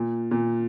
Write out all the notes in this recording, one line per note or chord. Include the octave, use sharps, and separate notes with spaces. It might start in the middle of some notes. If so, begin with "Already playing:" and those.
Already playing: A#2
A#2